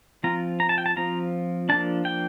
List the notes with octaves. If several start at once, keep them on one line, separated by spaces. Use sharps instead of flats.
F3 C4 F4 A#5
A#5
A5
G5
A5
F3 C4 F4 A#5
F3 A#3 D4 A5
G5